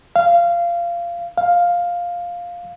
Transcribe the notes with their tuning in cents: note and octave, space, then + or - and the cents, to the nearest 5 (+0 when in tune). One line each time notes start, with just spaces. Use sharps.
F5 -20
F5 +5